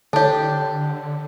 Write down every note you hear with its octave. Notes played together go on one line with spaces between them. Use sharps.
D3 D4 G4 A4 C#5 A5